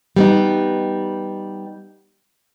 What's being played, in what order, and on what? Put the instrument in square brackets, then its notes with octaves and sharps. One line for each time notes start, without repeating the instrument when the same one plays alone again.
[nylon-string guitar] G3 B3 D#4